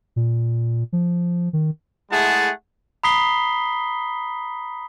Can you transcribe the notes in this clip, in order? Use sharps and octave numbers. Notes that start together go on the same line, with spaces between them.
A#2
F3
D#3
G#3 A3 E4 G#4 F#5 A5
A#5 B5 D#6 B6 C7 G7